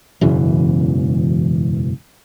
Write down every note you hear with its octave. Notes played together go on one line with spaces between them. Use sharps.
E1 F#2 C#3 E3